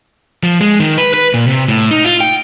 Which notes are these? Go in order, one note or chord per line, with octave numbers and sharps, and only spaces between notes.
F3
G#3
D#3
B4
B4
A#2
C3
A2
D#4
F4
G5